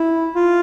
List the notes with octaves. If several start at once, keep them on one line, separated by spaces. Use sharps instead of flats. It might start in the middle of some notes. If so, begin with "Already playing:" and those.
Already playing: E4
F4